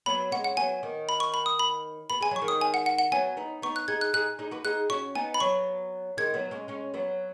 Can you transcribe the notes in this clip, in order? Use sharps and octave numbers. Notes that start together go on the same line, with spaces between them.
F#3 B3 B5
G#3 C#4 F#5
F#5
F#3 B3 G#5
D#3
B5
C#6
B5
D#6
B5
B3 B5
G#3 G#5
F#3 C#6
D#3 G#3
D#6
G#5
F#5
F#5
F#5
F#3 B3 G#5
B3 D#4
B3 D#4 C#6
F#6
D#4 G#4 G#6
F#6
D#4 G#4 F#6
D#4 G#4
F#4 B4
D#4 G#4 F#6
C#4 F#4 C#6
B3 D#4 G#5
B5
F#3 B3 C#6
D#3 G#3 G#6
F#3 B3
G#3 C#4
G#3 C#4
F#3 B3